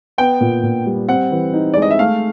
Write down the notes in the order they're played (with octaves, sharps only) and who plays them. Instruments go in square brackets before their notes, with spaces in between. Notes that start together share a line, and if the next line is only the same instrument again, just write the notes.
[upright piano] B3 [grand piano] G5
[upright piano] A#2
A#2
G3
[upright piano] C4 [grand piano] F#5
[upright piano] E3
D#4
[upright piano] G#3 [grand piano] D5
[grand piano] D#5
E5
[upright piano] A3 [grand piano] F5